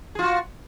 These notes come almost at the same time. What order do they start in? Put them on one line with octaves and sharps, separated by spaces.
G#4 F4 F#4